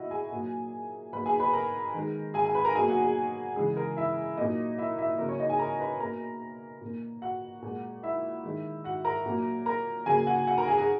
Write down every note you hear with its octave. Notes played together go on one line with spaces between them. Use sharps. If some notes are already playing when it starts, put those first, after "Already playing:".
Already playing: B2 A#3 D#4 E4 F#4 D#5 E5 F#5
G#4 G#5
A#2 F#3 A#3
B2 F#3 A#3 B4 B5
G#4 G#5
B4 B5
A#4 A#5
D#3 G#3
G#4 G#5
G#4 G#5
B4 B5
A#4 A#5
B2 F#3 A#3 G#4 G#5
F#4 F#5
G#4
C#3 E3 G#3 G#4
A#4
E4 E5
A#2 F#3 A#3 D#4 D#5
E4 E5
E4 E5
C#3 F#3 A#3 A#4
C#4 C#5
D#4 D#5
G#4 G#5
A#4 A#5
B4 B5
B2 A#3 A#4 A#5
A#2 A#3
F#4 F#5
A#2 G#3
E4 E5
D#3 G#3
F#4 F#5
A#4 A#5
A#2 F#3 A#3
A#4 A#5
C#3 F#3 A#3 G#4 G#5
F#4 F#5
F#4 F#5
A#4 A#5
G#4 G#5
G#4 G#5